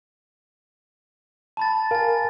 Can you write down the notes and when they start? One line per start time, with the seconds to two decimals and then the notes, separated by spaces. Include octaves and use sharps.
1.57 A5 B5 A6
1.91 A#4 F5 G#5 A6